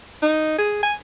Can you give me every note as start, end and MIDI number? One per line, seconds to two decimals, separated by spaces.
0.22 0.57 63
0.58 0.79 68
0.83 0.94 80